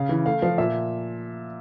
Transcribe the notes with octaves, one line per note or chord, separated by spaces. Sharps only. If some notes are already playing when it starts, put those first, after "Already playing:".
Already playing: C#3 F5
E3
A3 F5
F3 F5
A#2 E5